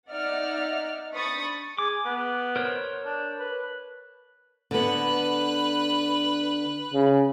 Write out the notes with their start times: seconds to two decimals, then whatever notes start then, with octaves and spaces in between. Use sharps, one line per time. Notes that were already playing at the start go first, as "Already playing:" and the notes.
0.10 D#4 D5 E5 F#5 F6
1.12 D4 C5 B5 C#6 D#6 A6
1.78 G#4 D6
2.05 B3
2.56 A#4 C5 C#5
3.06 D4
3.39 B4
4.71 D3 B3 B4 F#6
6.94 C#3